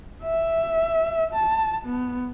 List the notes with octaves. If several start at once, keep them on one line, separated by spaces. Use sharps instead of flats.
E5
A5
B3